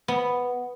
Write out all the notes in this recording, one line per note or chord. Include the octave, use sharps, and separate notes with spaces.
B3